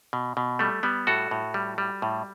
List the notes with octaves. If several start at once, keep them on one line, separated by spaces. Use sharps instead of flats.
B2
B2
G3 A3
G3 B3
A2 F#4 A4
A2
G3
G3
A2